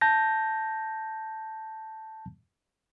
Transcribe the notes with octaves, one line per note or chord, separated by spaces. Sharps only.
A5 G6 A#6